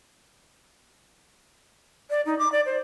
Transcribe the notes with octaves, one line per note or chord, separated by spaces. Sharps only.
D5
D#4
D6
D5
C5